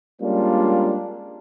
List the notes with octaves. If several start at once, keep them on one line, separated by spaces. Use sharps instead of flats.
G3 G#3 A#3 C#4 D4 F4